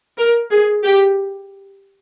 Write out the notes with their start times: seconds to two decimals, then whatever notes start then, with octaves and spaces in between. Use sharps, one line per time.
0.18 A#4
0.51 G#4
0.83 G4